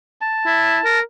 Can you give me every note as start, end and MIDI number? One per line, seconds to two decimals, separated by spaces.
0.21 0.99 81
0.46 0.79 64
0.85 1.00 70